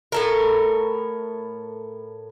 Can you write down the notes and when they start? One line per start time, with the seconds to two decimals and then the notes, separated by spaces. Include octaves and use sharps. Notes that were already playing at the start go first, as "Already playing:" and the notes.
0.12 A2 A4 A#4